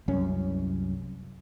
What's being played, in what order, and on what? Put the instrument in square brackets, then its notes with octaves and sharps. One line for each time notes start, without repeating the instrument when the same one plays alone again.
[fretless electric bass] C2 F#2 C#4